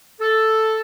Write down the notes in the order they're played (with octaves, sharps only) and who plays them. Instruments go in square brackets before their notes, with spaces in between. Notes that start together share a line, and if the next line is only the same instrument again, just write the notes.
[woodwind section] A4